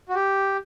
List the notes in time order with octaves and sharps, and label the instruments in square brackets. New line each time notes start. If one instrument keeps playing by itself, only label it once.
[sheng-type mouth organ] F#4
G4